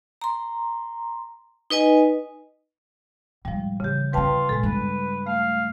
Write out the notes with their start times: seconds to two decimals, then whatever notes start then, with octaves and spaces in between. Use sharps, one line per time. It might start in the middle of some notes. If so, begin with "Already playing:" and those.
0.22 A#5 C6
1.70 D#4 B4 D#5 G#5
3.45 A2 F3 G3 G#3
3.80 C#3 E3 G4
4.13 D3 C4 F4 B4 G5 A5
4.49 A#2 D3 G#3 A4
4.63 G2 B3 B4
5.27 A3 F5